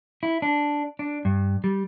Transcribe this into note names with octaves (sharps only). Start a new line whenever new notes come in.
E4
D4
D4
G2
G3